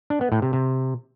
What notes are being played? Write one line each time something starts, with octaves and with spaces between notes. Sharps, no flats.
D4
B3
A2
C3
C3